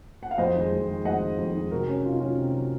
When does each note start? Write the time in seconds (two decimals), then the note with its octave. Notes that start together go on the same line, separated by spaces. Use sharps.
0.23 F#5
0.31 F5
0.38 F2 C5 D#5
0.55 D#3 G#3
0.72 F2
0.88 D#3 G#3
1.04 F2 D#5 F#5
1.22 D#3 G#3
1.38 F2
1.55 D#3 G#3
1.71 C3 F#4 A#4
1.88 F#3 C#4
2.05 C3 F4
2.12 D#4
2.20 F#3 C#4 F4
2.38 C3
2.54 F#3